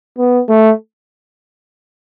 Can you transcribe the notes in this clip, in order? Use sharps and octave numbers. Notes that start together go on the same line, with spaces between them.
B3
A3